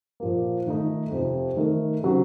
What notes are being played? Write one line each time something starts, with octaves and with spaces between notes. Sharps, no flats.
A#2 F3 A#3
D#3 A3 D#4
F2 C3 F3
D#3 A3 D#4 A#4
C#3 F#3 C4 F#4